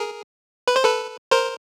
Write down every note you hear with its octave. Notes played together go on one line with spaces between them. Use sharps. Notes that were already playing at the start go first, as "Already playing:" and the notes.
Already playing: G#4 A#4
B4
C5
A4 B4
A#4 C5